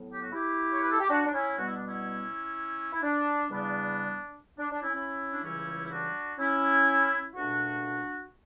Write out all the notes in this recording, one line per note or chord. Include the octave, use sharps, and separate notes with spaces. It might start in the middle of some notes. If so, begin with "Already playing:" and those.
Already playing: A2 F#3 B3
G4
F#4
E4 G4
C#5
B4
A4
G4
D4 F#4
D4
C#4 E4
B2 G3 B3 F#4
E4
D4
C#4 E4
E4
D4
E2 C#3 G3 B3 D4
D4
D4
C#4 E4
C#4 E4
D4
C#2 C#3 E3 G3 C#4 E4
E4
D4 F#4
C#4 E4
C#2 B2 A3 D4 F#4